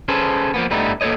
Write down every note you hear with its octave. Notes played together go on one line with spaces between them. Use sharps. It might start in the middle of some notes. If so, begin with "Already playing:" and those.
C#4 G#4 A4 B4 C5
F3 A#3 B3
G2 G3 A3 B3 D#4 E4
A#3 A4 C5 C#5 D#5